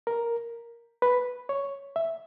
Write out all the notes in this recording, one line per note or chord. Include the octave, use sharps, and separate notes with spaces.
A#4
B4
C#5
E5